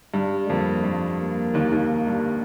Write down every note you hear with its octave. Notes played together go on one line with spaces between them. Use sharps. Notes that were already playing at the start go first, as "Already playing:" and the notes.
G2 G3
F2 A#3
G2
A#3
D#2 D#3
D#2 D#3
G2